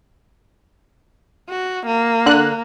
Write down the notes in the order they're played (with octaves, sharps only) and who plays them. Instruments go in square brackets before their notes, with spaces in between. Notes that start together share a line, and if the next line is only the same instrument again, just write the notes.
[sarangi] F#4
A#3
[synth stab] D3 F#6